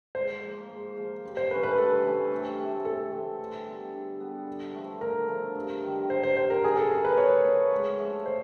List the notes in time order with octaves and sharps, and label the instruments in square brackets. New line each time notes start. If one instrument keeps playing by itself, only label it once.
[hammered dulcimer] G#2 [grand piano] C5
[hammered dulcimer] F3 A#3
G#2
F3 A#3
G2
[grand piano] C5
[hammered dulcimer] E3 A3 C#4 [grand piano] B4
[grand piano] B4
[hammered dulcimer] G2 [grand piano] A4
[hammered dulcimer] E3 A3 C#4
C3
E3 A3 C4
[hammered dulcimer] C3 [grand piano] A4
[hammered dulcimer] E3 A3 C4
D3
G3 B3
D3
G3 B3
D3
F3 A3
[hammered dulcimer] D3 [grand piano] A#4
[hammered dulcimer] F3 A3
G2
D#3 G3
[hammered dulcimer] G2 [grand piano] C5
[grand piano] C5
[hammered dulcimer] D#3 G3 [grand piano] C5
[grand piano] A#4
[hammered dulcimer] F3 [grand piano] G#4
[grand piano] A4
[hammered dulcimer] A3 C#4 F#4 [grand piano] A#4
[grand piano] B4
[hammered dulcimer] F3 [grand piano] C#5
[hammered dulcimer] A3 C#4 F#4
G#2
F3 A3
[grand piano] C5